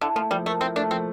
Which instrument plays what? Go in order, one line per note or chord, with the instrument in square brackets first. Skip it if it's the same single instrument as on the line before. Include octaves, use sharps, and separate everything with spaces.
[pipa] D3 [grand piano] E4
[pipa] F3 [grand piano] A3
[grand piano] F3 [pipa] G3
[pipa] A3 [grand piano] A#4
[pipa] C4 [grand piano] E4
[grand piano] A3 [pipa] D4
[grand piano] F3 [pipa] C4